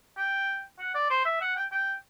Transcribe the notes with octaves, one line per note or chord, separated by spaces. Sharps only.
G5
F#5
D5
C5
E5
F#5
G5
G5